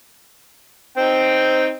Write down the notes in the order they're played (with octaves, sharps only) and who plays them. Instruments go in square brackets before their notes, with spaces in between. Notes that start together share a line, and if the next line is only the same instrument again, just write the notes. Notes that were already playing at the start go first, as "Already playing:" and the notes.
[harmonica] C4 D#4 G5